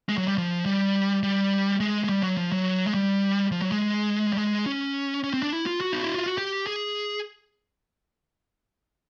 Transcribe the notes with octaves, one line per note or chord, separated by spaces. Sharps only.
G#3
F#3
G3
F3
G3
G3
G#3
G#3
G3
F#3
F3
F#3
G#3
G3
F3
F#3
G#3
G3
G#3
C#4
C#4
C4
D4
E4
F4
F#4
D#4
E4
F4
F#4
G4
G#4